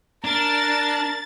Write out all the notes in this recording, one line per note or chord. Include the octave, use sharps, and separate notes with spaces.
D4 A#4 A5 A6